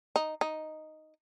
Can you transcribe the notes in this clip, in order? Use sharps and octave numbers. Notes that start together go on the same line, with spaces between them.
D#4
D#4